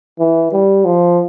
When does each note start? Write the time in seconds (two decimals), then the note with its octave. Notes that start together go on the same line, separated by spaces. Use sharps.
0.20 E3
0.52 G3
0.85 F3